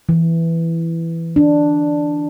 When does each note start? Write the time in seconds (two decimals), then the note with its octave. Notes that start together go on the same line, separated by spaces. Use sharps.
0.09 E3
1.36 D4